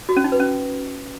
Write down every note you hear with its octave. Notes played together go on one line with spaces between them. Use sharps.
F#4
C#4
D#4
B4
C#4